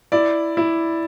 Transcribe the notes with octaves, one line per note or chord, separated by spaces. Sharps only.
E4 D5
E4